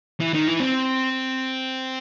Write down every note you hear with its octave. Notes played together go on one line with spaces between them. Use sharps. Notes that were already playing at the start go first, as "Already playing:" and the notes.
E3
D#3
E3
C4